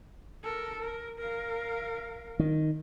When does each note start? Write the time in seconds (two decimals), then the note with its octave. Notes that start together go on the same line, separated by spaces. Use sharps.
0.43 A4 A#4
0.79 A#4
1.18 A#4 F5
2.39 D#3